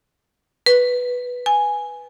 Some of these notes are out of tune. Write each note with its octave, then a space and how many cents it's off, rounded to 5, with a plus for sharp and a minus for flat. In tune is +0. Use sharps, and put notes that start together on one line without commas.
B4 +0
G#5 +0